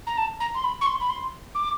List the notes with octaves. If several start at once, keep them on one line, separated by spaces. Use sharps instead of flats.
A#5
A5
A#5
C6
B5
C#6
C6
B5
C6
D6